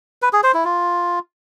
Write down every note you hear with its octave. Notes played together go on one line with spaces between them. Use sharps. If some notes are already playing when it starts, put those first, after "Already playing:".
B4
G#4
C5
E4
F4